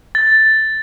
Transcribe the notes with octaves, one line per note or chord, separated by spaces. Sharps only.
A6